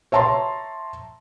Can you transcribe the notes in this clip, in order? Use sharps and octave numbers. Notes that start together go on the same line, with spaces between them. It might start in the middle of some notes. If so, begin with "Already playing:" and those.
C#5 E5 A5 A#5 C6